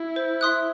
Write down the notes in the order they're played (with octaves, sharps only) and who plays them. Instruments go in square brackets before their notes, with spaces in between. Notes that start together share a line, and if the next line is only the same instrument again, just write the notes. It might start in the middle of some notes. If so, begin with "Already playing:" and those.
Already playing: [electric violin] E4
[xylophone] C5
E5 C6 D#6 F#6